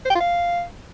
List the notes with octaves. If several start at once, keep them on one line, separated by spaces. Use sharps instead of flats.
C5
G5
F4
F5